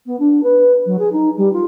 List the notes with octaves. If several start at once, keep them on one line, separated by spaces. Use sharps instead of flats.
B3
D4
B4
F#3
G#4
D#4
G3
F4